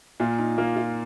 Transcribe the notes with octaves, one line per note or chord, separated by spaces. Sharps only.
A#2 F4
D#4
A#3 F4
F4